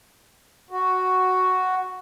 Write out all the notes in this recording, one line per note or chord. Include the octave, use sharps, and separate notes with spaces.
F#4